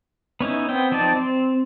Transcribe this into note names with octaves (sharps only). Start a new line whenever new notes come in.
B3 C#4 D#4 E4
B3 C4 G5
F3 C4 D#4 D5 A5
C4